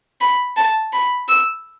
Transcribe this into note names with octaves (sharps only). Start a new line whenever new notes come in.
B5
A5
B5
E6